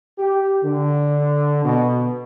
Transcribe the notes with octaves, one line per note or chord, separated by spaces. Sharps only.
G4
D3
B2